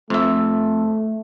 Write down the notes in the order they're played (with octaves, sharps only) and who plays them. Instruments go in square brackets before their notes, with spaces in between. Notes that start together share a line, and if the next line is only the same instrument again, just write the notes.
[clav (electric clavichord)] F2 E5 [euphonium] A3